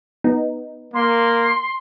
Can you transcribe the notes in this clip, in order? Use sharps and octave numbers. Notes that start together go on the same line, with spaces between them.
B3 D#4
A#3 C6